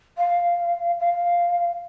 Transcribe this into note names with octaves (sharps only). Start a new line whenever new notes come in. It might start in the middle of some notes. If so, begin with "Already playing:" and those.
F5
F5